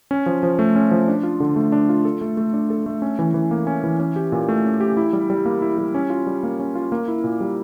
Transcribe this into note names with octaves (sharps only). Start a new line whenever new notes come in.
C#4
F3
F3
A3
C#4
F3
D4
F4
D3
A3
D4
F4
A4
A3
A3
D4
A4
A3
C#4
E3
E3
A#3
C#4
E3
C#4
G4
A#2
A3
C#4
G4
E4
G3
G3
A#3
E4
G3
C#4
F4
G3
A#3
C#4
F4
A#3
E4
A#2
G3